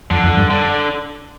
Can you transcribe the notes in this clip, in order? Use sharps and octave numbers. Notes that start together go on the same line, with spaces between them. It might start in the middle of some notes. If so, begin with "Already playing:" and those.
F2 D3
F2
G2
D3